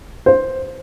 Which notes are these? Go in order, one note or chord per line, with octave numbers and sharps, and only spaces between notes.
C5